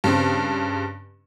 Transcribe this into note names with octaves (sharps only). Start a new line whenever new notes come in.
G2 C#3 C4